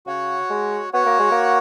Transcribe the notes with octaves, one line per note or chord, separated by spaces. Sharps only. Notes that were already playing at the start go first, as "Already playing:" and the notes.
C#3 F#4 C#5 F#5
G#3
B3 F#4 C#5 F#5
A#3
G#3
A#3